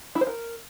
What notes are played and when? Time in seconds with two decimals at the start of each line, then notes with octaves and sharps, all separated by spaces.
0.15 E4
0.21 C5
0.27 A#4